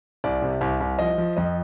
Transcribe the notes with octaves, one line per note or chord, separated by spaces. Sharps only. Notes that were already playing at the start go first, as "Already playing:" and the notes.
C2 D5
C3
C2
C2
F3 D#5
F3
F2 D#5